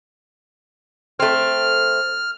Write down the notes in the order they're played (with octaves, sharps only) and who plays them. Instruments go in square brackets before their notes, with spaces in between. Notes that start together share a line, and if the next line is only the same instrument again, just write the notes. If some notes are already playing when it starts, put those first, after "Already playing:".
[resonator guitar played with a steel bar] A3 C4 [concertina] F6